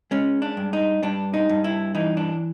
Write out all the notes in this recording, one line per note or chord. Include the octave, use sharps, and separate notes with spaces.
G#3 C#4
D4
G2
D#4
G2 D4
D#4
G2
E4
E3 D#4
D4